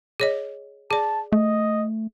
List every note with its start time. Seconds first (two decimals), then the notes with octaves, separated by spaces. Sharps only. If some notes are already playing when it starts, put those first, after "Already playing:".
0.20 G#4 C#5 D#5
0.91 G#4 D5 A5
1.32 A3 D#5